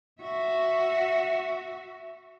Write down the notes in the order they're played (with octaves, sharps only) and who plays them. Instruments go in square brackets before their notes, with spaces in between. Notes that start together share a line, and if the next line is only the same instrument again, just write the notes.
[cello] F#4 E5